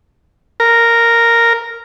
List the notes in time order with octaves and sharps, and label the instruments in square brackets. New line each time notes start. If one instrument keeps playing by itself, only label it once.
[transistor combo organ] A#4